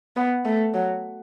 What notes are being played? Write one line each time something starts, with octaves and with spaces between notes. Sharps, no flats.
B3
A3
F#3